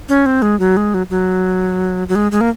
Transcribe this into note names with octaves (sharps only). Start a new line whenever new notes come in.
C#4
C4
G#3
F#3
G#3
F#3
F#3
F#3
G#3
G#3
A#3